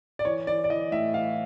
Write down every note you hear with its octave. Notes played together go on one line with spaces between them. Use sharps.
D5
E3 C#5
E3 D5
D5
E3 D#5
A2 E5
E3 F5